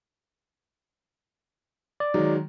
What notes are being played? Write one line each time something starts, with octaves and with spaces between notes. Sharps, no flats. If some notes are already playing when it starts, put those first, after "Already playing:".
D5
D#3 F#3 G#3